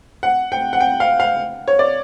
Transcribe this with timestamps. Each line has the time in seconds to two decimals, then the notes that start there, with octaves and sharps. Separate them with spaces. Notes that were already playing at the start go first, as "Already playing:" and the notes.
0.23 F#5
0.52 G5
0.73 F#5
0.81 G5
1.00 F5
1.20 F5
1.68 C#5
1.79 D5